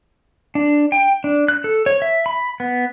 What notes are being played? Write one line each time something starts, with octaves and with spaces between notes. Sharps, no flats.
D4
G5
D4
F#6
A4
C#5
E5
B5
B3